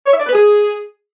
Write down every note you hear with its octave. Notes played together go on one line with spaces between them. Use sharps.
C#5
E5
D5
B4
G#4